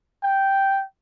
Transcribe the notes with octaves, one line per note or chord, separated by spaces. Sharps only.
G5